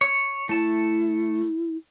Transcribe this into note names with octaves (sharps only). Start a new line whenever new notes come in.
C#5
A3 E4 A5